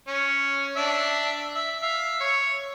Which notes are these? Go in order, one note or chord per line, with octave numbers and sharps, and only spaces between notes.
C#4
D4 E5
E5
E5 F5
C#5